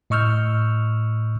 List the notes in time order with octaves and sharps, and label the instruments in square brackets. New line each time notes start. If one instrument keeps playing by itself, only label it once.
[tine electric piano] A2 D#5 C#6 E6 F6 G6